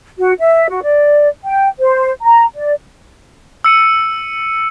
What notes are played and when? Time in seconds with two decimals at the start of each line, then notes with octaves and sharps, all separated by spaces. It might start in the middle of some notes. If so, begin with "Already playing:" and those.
0.18 F#4
0.39 E5
0.69 F#4
0.82 D5
1.43 G5
1.79 C5
2.21 A#5
2.55 D5
3.64 E6 C#7 D#7